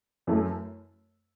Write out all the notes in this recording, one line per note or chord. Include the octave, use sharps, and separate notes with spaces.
F#2 E3 A3